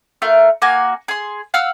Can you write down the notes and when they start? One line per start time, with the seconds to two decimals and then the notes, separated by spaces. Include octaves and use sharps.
0.22 A3 F4 A#4
0.62 A#3 F#4 G#5
1.08 G#4 C6
1.54 F5 F#5 E6 F6